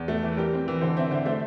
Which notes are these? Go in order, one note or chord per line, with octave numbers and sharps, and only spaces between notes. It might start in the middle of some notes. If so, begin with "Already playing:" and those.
Already playing: E2
A3
E3
G3 G4 A#4
C4
E3
D3 A4 C5
C4 C5 E5
D3 C5 E5
A3 C5 E5